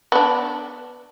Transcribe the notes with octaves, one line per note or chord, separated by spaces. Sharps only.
B3 D4